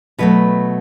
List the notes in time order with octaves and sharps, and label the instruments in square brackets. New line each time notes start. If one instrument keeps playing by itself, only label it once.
[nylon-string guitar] B2 F#3 A3 B4